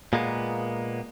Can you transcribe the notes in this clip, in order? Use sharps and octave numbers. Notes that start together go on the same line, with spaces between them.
A#2 G#3 A#3 B3